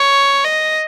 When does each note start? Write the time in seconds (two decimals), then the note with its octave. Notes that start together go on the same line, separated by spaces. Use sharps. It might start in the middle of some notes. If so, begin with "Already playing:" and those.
Already playing: C#5
0.45 D#5